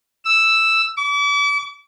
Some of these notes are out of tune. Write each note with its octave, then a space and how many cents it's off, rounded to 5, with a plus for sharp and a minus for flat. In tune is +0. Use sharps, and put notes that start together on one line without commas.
E6 +0
D6 -40